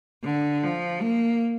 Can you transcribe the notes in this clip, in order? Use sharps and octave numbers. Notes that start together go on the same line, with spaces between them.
D3
F3
A#3